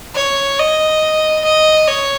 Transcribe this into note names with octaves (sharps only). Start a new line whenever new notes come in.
C#5
D#5
D#5
C#5